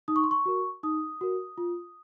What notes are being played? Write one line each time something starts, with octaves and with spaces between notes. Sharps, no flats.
D#4 D#6
C#6
C6
C#6
F#4 A#4
D#4 D#6
F#4 A#4
F4